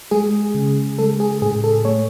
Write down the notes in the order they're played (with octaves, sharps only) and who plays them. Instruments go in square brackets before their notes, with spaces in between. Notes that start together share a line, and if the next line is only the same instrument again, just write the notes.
[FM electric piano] G#3 G#4
C#3
G#3 A4
G#4
A2 G#4
A4
A3 C#5